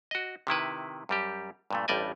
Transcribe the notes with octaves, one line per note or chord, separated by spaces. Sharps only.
F#4 D#5
C3 D#3 E4 B4
F#2 G3 G4
G2 A#2 A3
A1 G2 G3 D5 D#5 G#5